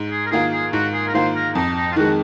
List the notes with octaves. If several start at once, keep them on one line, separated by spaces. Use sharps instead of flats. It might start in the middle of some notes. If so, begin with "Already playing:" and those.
Already playing: G#2
G#4
A#4
D#3 A#3 F4 G#4
G#4
G#2 F#4
G#4
A#4
D#3 A#3 F4 C5
A#4
F2 D#4
D#4
F4
D#3 G#3 F#4